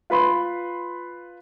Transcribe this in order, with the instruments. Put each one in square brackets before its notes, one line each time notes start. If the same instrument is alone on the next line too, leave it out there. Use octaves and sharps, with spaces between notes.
[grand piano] F4 B4 B5 C6